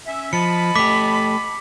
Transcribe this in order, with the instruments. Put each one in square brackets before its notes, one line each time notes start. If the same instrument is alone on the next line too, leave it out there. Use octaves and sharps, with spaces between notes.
[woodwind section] C#4 E5
[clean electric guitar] F3 [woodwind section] D#5 A5 B5 [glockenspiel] C#7
[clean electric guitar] A3 G4 [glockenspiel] D6 B6